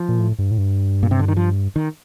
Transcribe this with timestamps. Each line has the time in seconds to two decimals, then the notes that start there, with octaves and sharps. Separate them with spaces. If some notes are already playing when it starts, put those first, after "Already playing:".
Already playing: F3
0.09 A#2
0.19 A2
0.39 G2
0.51 A2
0.58 G2
1.03 A#2
1.11 C3
1.19 D3
1.28 D#3
1.37 F3
1.76 D#3